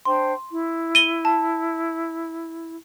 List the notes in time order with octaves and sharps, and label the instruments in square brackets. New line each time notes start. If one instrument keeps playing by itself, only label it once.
[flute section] D4 C5 G5 [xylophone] C6
[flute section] E4
[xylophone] D#7 G7
A5